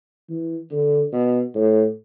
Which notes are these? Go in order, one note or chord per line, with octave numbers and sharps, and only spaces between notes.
E3
D3
B2
A2